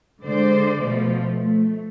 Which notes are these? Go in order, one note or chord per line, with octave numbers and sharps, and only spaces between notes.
D3 G#3 C5 D5
B2 F3 A3
A3